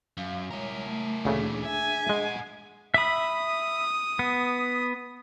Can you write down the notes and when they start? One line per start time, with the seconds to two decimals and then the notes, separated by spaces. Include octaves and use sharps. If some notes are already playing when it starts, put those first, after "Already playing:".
0.17 F#2 F5
0.51 G#3 E4 A#4 C#5
0.86 A3
1.25 D2 A#2 C#3 E3 A3 D4 G#4
1.65 E5 G#5
2.09 G#3 D#5 F#5
2.94 E5 B5 D#6
4.19 B3